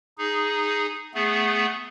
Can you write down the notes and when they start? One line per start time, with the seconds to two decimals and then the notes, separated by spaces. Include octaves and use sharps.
0.18 D#4 G#4
1.14 A3 B3 G#4